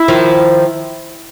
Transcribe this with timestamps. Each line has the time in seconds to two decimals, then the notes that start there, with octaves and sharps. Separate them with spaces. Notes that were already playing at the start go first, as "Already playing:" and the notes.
Already playing: E4
0.08 D#3 F3